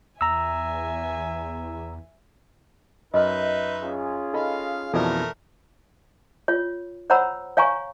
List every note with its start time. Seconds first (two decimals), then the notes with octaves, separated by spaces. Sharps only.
0.21 E2 E5 G#5 A#5 E6
3.14 F#2 D#4 B4 D#5 E5 B5 F6
3.82 C#4 F4 G#4
4.34 D#4 A4 D#5 F5 B5
4.93 F2 B2 E3 A3 A4 A#4 D5
6.48 F4 C#5
7.10 C5 C#5 F#5 A#5 B5 E6
7.57 C#5 F5 G#5 A#5 C#6